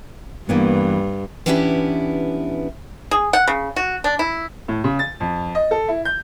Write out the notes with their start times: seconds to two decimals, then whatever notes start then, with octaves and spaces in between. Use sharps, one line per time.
0.49 G2 E3 A#3 B3
1.46 E3 B3 C#4 D4 E4 G4
3.11 G#4
3.33 F#5
3.48 C#3
3.76 F#4
4.04 D4
4.19 E4
4.68 A2
4.84 C#3
4.99 A6
5.20 F2
5.55 D#5
5.71 A4
5.88 E4
6.05 G6